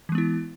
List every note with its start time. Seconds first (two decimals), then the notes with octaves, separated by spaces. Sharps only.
0.09 E3
0.12 G#3
0.15 B3
0.18 E4